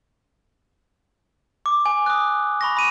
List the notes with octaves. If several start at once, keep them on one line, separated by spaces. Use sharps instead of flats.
D6
G#5
D#6 F#6
B5 C#6 A#6
B5 D#7